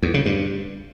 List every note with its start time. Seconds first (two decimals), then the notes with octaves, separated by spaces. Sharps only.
0.02 E2
0.14 C#3
0.26 G2